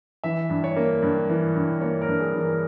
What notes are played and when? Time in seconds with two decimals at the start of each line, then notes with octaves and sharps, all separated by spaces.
0.24 E3 E5
0.50 G2
0.64 C#5
0.76 A#3
1.02 G2
1.29 E3
1.55 G2
1.81 A#3 C#5
2.01 A#4
2.07 G2
2.20 G#4
2.34 E3
2.40 A#4